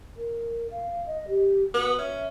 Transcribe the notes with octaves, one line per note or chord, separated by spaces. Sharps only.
A#4
F5
D#5
G4
B3 F#4
C#4 E5